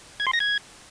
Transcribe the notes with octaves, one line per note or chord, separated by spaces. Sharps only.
G#6
C6
A#6
G#6